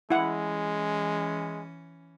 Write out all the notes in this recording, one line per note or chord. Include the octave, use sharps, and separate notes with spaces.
E3 G#3 C#4 E4 F#5